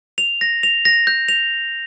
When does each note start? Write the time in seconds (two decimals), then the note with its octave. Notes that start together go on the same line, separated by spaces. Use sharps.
0.18 F7
0.41 A#6
0.63 F7
0.85 A#6
1.07 G6
1.28 F7